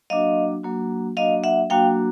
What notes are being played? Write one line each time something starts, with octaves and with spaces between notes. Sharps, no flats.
F#3 A#3 D4 F#4 D#5 F5
F#3 A#3 D4 F#4
F#3 A#3 D4 F#4 D#5 F5
E5 F#5
F#3 A#3 D4 F#4 F5 G5